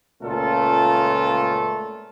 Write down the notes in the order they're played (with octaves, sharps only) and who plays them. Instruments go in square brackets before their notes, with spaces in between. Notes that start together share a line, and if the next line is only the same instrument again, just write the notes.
[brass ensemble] C#2 A#2 A3 C#4 F4 A4